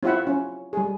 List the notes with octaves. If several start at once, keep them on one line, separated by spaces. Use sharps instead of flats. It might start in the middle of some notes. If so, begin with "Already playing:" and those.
C4 E4 F4 E5 F#5
C#4
G3 G#4